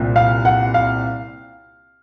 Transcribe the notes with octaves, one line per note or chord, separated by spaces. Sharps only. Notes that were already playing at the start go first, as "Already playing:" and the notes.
Already playing: C2 A#2 C4
F5
F#5
F5